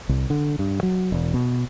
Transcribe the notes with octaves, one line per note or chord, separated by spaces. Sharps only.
C2
D3
G2
F#3
E1
B2